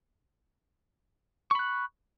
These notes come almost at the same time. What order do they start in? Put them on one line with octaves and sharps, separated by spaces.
C#6 B5 F#6